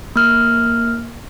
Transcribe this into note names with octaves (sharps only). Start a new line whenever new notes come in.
A#3 F6